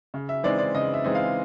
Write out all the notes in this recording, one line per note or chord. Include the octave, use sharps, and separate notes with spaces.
C#3
E5
E3 G#3 C4 D#4 D5
D5
C#3 D#5
E5
E3 G#3 C4 D#4
F5